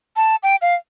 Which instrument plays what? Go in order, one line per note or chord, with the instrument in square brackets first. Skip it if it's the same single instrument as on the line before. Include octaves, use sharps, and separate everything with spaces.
[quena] A5
G5
F5